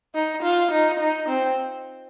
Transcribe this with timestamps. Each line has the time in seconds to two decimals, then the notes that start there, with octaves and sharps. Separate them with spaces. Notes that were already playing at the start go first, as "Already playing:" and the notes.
0.15 D#4
0.43 F4
0.71 D#4
1.00 D#4
1.29 C4